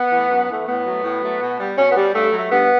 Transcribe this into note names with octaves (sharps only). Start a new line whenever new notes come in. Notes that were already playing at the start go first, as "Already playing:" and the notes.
Already playing: B3
E3 A3
F#2
E3 A3
A2 B3
F#3 A3
A2
F#3 A3
B2
G3
B2 C#4
B3
G3
G2 A3
F#3 A3
G2 B3